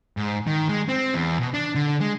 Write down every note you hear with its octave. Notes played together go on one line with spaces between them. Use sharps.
G#2
D#3
G#3
C4
E2
B2
D4
D3
G#3